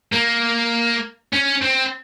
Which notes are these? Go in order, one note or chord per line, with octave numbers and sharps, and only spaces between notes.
A#3
C#4
C4